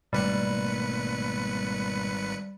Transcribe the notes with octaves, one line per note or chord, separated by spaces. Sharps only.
G#1 B2 G3 A3 A#3 B4 C#7